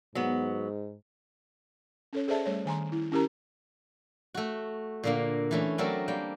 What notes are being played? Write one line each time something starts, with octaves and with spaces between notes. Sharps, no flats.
G#2 F#3 B3
C#4 A4 C#5
G#4 A4 C5 D5 E5 A5
G3 A3 C#5
D#3 G#5 A#5 C6
E4
C#4 E4 G4 A#4 A#5
A3 F#4
A#2 D3 A#3
E3 A3 C#4
F#3 A3 C4 D4 A4 A#4
G3 A#3 G5